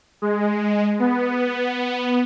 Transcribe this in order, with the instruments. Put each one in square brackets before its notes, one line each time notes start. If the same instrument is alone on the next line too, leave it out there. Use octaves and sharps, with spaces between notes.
[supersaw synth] G#3
B3